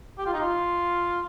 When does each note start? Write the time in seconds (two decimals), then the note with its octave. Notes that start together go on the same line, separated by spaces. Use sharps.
0.18 G4
0.26 F4
0.33 D#4
0.40 F4